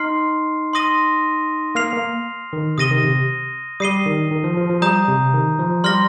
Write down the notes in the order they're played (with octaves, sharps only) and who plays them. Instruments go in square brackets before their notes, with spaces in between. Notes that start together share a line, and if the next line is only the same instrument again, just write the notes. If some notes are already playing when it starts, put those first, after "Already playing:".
Already playing: [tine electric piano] D#4 [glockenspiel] C6 F6 C7
[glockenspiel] C6 D#6 A#6 D#7 G7
[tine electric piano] A#3 [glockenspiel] F6 C7 F7
[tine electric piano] A#3
D#3
[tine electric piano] C3 [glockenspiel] D#6 A#6 D#7 G7
[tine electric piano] D#3
C3
[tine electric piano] G3 [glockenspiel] D#6 C7 D#7 G7
[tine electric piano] D#3
D#3
F3
F3
F3
[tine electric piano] G3 [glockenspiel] A#5 D#6 G6
[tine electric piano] C3
D#3
F3
[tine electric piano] G3 [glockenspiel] C6 F6 A#6 G7